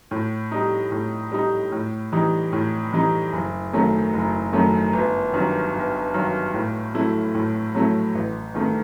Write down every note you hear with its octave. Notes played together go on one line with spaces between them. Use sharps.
A2
G3 D#4
A2
G3 D#4
A2
E3 G3 D#4
A2
E3 G3 D#4
F#1
F#2 D#3 F#3 A3
F#1
F#2 D#3 F#3 A3
G1
G2 D#3 F#3
G1
G2 D#3 F#3
A2
F#3 A3 E4
A2
F#3 A3 E4
A1
G2 D#3 A3